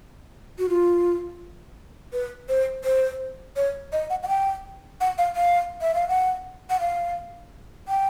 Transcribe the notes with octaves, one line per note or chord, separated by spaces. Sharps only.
F#4
F4
B4
C5
C5
C#5
D#5
F#5
F#5
G5
F#5
F5
F5
E5
F5
F#5
F#5
F5
G5